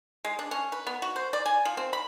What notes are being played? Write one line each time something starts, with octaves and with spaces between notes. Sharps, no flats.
G#3
D4
C#4
B4
B3
F#4
C5
D5
G#5
F3
C4
B5